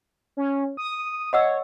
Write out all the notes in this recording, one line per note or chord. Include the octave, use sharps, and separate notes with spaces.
C#4
D#6
C#5 D#5 F#5 E6